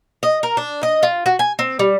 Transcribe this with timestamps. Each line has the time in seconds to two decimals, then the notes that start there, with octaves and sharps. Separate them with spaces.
0.23 D#5
0.43 A#4
0.57 D4
0.83 D#5
1.03 F4
1.26 F#4
1.39 G#5
1.59 C4
1.79 G3